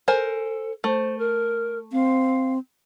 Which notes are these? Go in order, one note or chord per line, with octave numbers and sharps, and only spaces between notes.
A4 A#4 C5 G#5
A3 C5
A#4
C4 F5